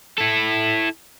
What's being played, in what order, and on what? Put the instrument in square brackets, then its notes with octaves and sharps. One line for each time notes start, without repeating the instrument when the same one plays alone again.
[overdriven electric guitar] E4 A4